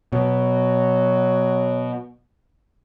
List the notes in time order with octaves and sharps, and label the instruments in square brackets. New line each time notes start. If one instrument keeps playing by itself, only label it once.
[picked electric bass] B2 [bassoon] F#3